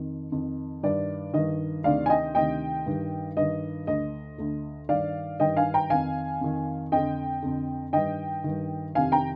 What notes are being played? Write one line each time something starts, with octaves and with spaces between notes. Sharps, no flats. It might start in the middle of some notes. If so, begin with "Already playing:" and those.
Already playing: F2 D#3
F2 D#3
G2 D#3 D5
G2 D#3 D#5
D2 C3 D#3 D5 F5
G#5
D#5 G5
D2 C3 D#3 D#5 G5
G2 D#3
G2 D#3 D#5
D2 D3 D#5
D2 D3
G2 D#3 D5 F5
G2 D#3 D#5 G5
F5 G#5
G5 A#5
F2 D#3 F5 G#5
F2 D#3
F2 D3 D#5 G5
F2 D3
G2 D#3 D#5 G5
G2 D#3
F2 C3 D#3 F5 G#5
G5 A#5